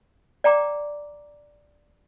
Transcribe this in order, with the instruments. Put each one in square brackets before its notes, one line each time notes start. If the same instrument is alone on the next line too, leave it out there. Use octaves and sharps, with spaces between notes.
[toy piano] D5 G5 A#5 D6